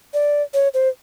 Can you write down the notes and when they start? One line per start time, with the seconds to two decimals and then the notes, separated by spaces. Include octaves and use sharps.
0.14 D5
0.54 C#5
0.74 C5